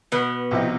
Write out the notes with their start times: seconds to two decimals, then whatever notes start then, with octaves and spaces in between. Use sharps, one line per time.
0.12 B2 B3
0.51 C2 C3 F3 C4 D#4